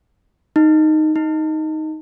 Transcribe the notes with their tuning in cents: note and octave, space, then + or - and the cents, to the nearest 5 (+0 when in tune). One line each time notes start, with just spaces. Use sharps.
D#4 -5
D#4 +5